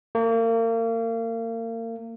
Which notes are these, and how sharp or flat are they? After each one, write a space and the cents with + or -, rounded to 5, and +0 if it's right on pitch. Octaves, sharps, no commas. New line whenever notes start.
A#3 -35